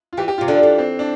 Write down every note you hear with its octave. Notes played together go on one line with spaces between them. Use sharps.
F4
E3 G4
G4
F4
C3
D3 D4
E3
C4
D4